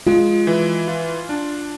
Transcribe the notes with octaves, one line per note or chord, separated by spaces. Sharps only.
G#3 F4
E3
F4
D4